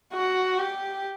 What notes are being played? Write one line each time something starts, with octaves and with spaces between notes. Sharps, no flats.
F#4
G4